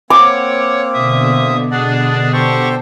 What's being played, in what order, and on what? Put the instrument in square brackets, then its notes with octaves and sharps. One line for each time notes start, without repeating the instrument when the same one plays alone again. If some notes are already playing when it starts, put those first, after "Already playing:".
[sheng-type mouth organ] A#3 C4 [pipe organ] C#5 F#5 [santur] D6
[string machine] B2 D3 [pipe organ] E5 D#6
[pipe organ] D4 G#4 D5 [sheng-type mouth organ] D#5 F#5
[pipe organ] G4 F#5 C#6 [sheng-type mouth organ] A4 C5 G5